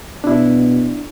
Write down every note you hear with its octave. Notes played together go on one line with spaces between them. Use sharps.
B2 D4 E4